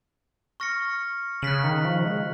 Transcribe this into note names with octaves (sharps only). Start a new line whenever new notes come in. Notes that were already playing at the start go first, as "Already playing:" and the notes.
C#6 F6 A#6 C#7
C#3 F#6 B6 F#7
D#3
F3
G#3